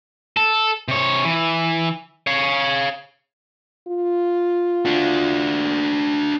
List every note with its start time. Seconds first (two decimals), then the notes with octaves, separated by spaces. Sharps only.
0.37 A4
0.88 C3 C#5
1.25 E3
2.27 C#5 F5
3.88 F4
4.85 D4 F#4